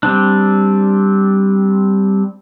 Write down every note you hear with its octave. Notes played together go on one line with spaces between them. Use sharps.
G3 C4 D4